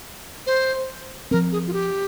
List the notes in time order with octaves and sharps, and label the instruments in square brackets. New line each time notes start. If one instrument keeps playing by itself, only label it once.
[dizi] C5
[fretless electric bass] C4 [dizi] A#4
[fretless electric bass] F3
[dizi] G#4
F4
G4